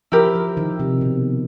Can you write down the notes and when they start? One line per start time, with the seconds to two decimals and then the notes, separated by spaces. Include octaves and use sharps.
0.12 F3 E4 G4 A#4
0.35 F3
0.57 D#3
0.79 C3
1.01 B2